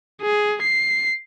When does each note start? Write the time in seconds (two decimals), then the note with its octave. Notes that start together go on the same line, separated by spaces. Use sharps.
0.21 G#4
0.63 C7